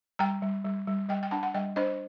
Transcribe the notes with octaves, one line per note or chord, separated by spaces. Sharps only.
G3 G5 A#5
G3
G3
G3
G3 D#5 G5
G5
D4 F#5 A5
F#5
G3 D#5 G5
D4 C5 D#5